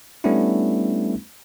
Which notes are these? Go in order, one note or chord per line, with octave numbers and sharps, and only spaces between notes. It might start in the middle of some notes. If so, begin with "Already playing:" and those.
G3 A3 B3 C#4 D4 E4